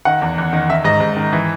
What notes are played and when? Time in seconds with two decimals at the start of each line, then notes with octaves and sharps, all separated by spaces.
0.05 D#3 F#5
0.22 E2
0.38 E2
0.53 D#3
0.70 D#3 E5
0.84 G#2 D#5
1.00 G#2
1.16 D#3
1.33 E3